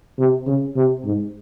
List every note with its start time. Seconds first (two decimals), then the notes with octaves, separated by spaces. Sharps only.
0.19 C3
0.47 C#3
0.76 C3
1.05 G#2